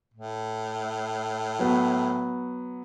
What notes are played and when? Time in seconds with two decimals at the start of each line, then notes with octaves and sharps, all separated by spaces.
0.14 A2
1.59 F#3 B3